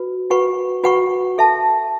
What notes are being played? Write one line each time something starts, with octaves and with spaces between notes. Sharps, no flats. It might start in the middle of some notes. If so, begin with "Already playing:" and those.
Already playing: F#4 B4
F#4 B4 F#5 C#6
F#4 B4 F#5 C#6
A4 E5 A5